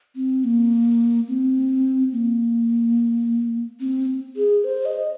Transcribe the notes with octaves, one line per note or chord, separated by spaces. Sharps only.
C4
A#3
C4
A#3
C4
G#4
C5
D#5